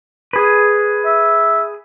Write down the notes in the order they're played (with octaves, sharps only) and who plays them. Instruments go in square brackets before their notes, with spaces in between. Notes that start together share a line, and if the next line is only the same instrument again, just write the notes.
[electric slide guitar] G#4 B4
[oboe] E5